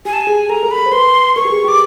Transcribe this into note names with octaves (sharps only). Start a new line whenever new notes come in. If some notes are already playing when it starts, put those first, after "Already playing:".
G4 G#5
A5
G#5
G#4
A4 A#5
A#4
B5
A#4
C5
B4 C6
A#4 C#6
G4
G#4
G4 D6